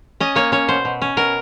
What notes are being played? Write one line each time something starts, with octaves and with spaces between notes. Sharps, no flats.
C#4 D#5
A#3 C#5
C#4 C#5
B2 C5
B2
C#4
B2 A#4